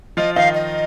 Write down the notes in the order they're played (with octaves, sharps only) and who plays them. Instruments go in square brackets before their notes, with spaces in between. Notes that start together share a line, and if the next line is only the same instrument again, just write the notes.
[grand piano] F3 F4 [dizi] D#5
[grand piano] D#3 D#4 [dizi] F5
[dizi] D#5